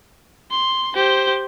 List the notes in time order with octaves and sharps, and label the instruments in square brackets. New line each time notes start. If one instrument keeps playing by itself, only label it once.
[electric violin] C6
G4 C5